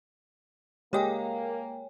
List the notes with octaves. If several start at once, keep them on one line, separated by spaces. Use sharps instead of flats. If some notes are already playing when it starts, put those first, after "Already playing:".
G#3 A#3 G4 C#5 D#5 G5 G#5